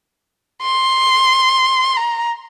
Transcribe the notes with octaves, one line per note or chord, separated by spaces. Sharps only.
C6
A#5